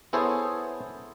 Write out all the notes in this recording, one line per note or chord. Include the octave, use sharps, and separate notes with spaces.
B3 E4 G#4 A4 C5 C#5